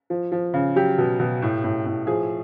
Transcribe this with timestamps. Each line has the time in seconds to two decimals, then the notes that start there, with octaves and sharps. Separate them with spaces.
0.10 F3
0.32 F3
0.54 C#3
0.76 F#3 G4
0.98 B2
1.19 B2
1.42 A2
1.64 A2
1.86 A2
2.07 F3 G#4